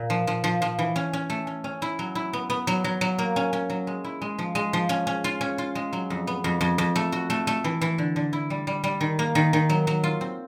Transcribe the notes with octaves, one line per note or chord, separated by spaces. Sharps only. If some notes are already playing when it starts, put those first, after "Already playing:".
Already playing: A#2
F3
F3
F3
F3
E3
C#4
C#4
A3
C#4
C#4
E4
F#3
E4
B3
B3
F#3
F#3
F#3
A#3
C#4
C#4
F#3
G#3
E4
G#3
F3
G#3
F3
C#4
C#4
F4
C#4
F4
G#3
F#3
F2
B3
F2
F2
F2
A3
F#4
A3
A3
E3
E3
D3
D3
E4
G3
G3
G3
D#3
A#3
D#3
D#3
F#3
F#3
F4
C4